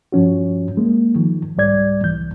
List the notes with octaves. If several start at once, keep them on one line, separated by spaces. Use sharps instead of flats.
G2 F3 C#4 F#4
G#3 A#3
D#3 F3
C2 G#2 G3 D5 G#6
C2 E3 G6